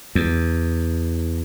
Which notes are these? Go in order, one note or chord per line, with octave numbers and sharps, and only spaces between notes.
E2